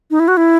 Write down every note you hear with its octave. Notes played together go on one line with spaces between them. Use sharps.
D#4
E4
F#4
E4